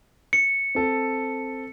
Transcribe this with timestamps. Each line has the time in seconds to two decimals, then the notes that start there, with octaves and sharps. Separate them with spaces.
0.33 C#7
0.75 C4 A4